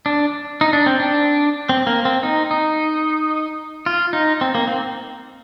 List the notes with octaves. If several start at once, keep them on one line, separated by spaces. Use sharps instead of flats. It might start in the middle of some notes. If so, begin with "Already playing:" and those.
D4
D#4
D4
C4
D4
C4
A#3
C4
D#4
D#4
F4
D#4
C4
A#3
C4